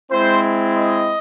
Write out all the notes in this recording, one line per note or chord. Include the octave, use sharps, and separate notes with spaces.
G#3 C4 E4 C5
D#5